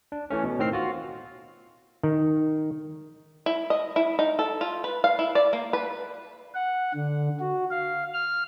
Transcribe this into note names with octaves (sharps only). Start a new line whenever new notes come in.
D4
E3 A3 C#4
B2
A2 D#3 C4 F6 C7
F4 F#4
D#3
E4
D#5
E4
D#4
A4
F4
B4
F5
E4
D5
A#3
B4
F#5
D3
F#4
F5
F6